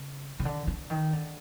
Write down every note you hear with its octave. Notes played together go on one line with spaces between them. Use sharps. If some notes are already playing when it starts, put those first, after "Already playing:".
Already playing: C#3
C#3
D3
D3
D#3
D3